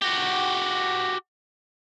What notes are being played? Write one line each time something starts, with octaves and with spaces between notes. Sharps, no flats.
F#4 G4